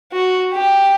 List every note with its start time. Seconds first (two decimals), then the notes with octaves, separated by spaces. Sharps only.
0.13 F#4
0.53 G4